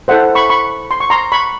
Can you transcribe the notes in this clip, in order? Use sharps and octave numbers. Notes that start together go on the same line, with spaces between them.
E4 A4 C5 E5 F#5
B5 C#6
B5 C#6
C6
C#6
A#5 C6
B5 C#6